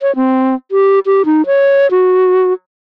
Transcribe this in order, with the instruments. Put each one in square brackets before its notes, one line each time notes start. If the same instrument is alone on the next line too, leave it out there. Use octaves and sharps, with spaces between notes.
[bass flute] C#5
C4
G4
G4
D#4
C#5
F#4